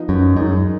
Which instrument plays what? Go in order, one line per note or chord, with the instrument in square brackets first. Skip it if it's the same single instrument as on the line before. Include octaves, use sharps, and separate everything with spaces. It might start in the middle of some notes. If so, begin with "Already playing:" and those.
Already playing: [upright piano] F3 B3 D#4
[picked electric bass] F#2
[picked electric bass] F#2 [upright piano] D#3 G#3 D#4